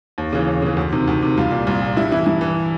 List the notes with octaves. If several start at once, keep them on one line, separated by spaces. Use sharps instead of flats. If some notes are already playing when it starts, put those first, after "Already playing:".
D#2
C#3 E3
D#2
C#3 E3
D2
C3 D#3
D2
C3 D#3
C2 F4
A#2
C2
A#2
G2 E4
E3 E4
G2 E4
E3